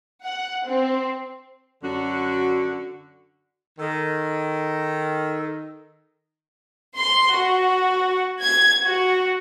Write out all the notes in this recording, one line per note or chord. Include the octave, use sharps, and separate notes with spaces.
F#5
C4
F#2 D3 F#4
D#3 A4
C6
F#4
G#6
F#4